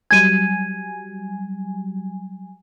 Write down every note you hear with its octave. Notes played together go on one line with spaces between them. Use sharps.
F#3 G3 G#5 G#6 D#7